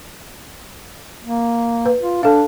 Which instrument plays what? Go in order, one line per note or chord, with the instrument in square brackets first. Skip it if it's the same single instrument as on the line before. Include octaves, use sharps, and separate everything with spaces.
[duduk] A#3
[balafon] B4
[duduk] F4
[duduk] D4 [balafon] A4 F5